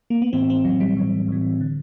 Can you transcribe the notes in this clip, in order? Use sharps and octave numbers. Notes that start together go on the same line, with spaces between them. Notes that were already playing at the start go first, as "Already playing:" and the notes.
A#3
B3
A2 E3 C4
C4
A2 E3 F#3
G3
A2 E3
A2 E3
D3